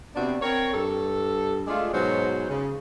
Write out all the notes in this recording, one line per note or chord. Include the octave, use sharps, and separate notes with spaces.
C3 B3 C4 D4 F#4
C4 A#4 C#5
G2 A4
G#3 A3 D4 F4
G#2 B2 F#3 C5
C#3